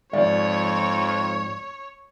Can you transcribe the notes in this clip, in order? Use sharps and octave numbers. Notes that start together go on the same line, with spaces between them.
F2 G#2 F3 C#5 D5